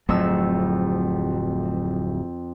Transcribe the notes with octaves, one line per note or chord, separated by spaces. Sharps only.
D1 F2 F#3 A3 E6